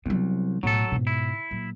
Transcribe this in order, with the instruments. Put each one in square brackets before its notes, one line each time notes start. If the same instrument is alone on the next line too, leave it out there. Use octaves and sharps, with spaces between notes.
[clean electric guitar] C2 [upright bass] F#3 B3
[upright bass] B1 A2 [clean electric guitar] F#3 A4
[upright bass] G#2 B2
[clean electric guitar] E4
[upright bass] A#2 F#3